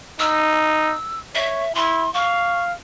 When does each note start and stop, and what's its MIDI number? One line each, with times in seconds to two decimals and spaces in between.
0.19 0.94 63
0.19 1.20 88
1.35 1.65 73
1.35 1.75 76
1.75 2.09 64
1.75 2.13 84
2.14 2.73 77
2.14 2.63 85